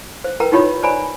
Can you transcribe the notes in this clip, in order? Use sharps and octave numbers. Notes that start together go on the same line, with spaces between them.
C5
A#4 B4 G5 A#5
D#4 F4 G4 C#5 D#5 B5
C5 D5 G#5 A#5 B5